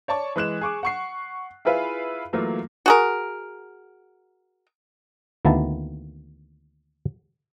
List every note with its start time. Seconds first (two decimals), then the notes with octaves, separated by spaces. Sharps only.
0.08 C#5 D5 A5 C#6
0.36 E3 G#3 F#6 E7
0.61 G#4 C#6 D6
0.83 F#5 C#6 C7
1.65 E4 F4 G#4 B4 E5 F5
2.33 E3 F#3 A3 A#3 F4
2.86 F#4 G#4 A#4
5.45 D2 D#3 A#3 B3 E4 A5